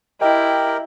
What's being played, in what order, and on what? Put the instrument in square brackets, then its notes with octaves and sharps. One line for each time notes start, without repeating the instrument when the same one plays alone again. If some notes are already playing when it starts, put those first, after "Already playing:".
[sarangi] E4 [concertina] G4 A#4 [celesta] D#5 [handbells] G5